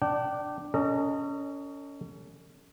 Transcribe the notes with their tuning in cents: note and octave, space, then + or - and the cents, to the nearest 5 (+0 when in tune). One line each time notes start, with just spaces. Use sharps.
D4 +5 G5 -30
C#4 +25 A#4 -45 D#5 +0